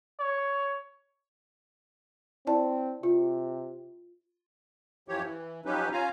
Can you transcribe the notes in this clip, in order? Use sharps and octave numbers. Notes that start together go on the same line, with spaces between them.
C#5
C4 E4 D5 A5
C3 F4
F#2 E3 F3 G4 C#5
E3
F3 F#3 C#4 D#4 G4 B4
C#4 F4 F5 G#5 A#5